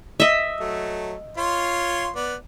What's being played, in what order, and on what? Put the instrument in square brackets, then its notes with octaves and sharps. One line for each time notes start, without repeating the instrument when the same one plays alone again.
[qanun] D#5 E5
[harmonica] F#3 A3
F4 C#5 C6
B3 D5